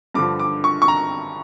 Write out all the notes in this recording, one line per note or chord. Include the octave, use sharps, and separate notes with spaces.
G2 D3 F3 D6
D6
C#6
C#6
A#5